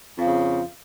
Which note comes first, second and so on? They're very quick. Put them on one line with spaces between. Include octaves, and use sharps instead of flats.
F2 F3 C#3